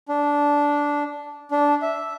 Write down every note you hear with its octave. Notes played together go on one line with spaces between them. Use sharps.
D4
D4
E5